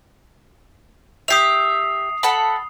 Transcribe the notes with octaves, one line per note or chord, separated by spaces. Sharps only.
G4 E5 D#6 C7 F7
A4 F#5 B5